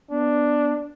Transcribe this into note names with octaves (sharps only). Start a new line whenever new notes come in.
B3 D4